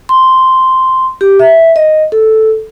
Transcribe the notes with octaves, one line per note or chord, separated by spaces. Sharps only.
C6
G4
E5
D#5
A4